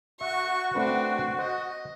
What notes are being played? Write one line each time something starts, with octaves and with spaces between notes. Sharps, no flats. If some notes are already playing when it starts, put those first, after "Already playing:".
F#4 E5 C#6
A3 C4 D4 B4
C5 D#5